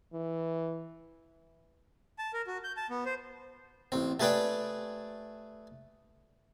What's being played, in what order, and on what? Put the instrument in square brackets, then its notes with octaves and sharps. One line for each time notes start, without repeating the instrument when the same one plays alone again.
[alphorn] E3
[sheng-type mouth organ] A5
A#4
F#4
G6
A5
B3
C5
[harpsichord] A1 C4
A3 G4 G#4 B4 D5 G5